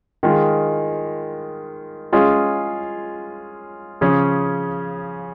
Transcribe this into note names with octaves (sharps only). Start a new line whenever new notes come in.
D#3 G#3 F4
G#3 C#4 F4 G#4
C#3 F3 C#4 G#4